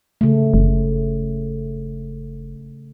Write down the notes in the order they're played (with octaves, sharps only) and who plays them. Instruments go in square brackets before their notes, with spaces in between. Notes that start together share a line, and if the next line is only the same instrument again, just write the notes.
[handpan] C#3 A3
[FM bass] F#1